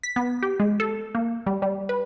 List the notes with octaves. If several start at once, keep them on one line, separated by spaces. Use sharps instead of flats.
B6
B3
G4
G#3
A4
A#3
G3
G3
B4